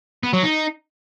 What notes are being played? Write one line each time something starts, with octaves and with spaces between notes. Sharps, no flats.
B3
F#3
D#4